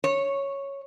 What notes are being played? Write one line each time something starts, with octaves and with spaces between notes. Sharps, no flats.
C#5